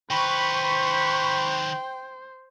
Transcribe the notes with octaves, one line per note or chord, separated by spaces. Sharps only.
D#3 B4 C5 G5 B5 C#6